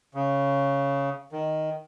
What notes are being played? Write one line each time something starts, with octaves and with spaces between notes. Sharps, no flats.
C#3
D#3